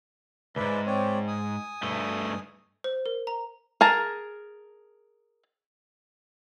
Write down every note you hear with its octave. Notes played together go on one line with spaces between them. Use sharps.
C#2 G#2 B4 D5 E5
C4 C#5 D5
G#5 D#6
G2 A3
C5
A#4
A#5
G#4 A#4 A5